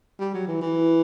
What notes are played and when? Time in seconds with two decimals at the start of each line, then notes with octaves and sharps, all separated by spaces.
0.20 G3
0.34 F#3
0.48 E3
0.62 E3